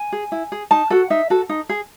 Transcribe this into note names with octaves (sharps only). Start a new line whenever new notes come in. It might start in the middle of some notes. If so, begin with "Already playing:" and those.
Already playing: G#5
G#4
E4
G#4
D#4 A5
F#4 A4 F#5
D#4 E5
F#4 A4
D#4
G#4